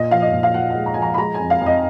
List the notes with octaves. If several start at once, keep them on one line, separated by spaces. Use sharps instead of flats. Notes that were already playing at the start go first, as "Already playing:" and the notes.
Already playing: A#2 D#5
F3 F5
D#5
A#2
F5
A#2 F#5
G#3 F#5
A#5
F3 G#5
A#5
B5
G#3 A#5
G#5
F2
F5
F2
D#5